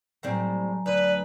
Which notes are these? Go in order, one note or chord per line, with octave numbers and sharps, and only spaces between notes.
A2 F#3 G3 C4 G#5 A#5
D2 B4 D5